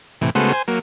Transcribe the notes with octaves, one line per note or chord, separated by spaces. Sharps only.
A2 C3 E3
C#3 G#3 A3 B3 F#4 C5
C5 G#5
F#3 A#3